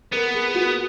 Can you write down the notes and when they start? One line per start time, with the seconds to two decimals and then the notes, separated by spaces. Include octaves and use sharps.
0.13 B3 A#4
0.34 G#4
0.55 F#4